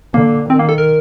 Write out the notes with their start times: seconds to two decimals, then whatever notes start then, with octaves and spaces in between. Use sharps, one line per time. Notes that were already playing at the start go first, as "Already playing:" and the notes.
0.14 D3 A#3
0.50 D#3 C4
0.59 A#3
0.69 A4
0.78 A#4